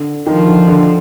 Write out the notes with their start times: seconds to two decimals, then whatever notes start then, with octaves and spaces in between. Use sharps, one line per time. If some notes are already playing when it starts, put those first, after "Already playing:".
Already playing: D3
0.26 D#3 F3
0.47 D3
0.68 D3